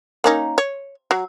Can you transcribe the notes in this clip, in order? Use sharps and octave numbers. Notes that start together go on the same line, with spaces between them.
A#3 C#4 D#4
C#5
F#3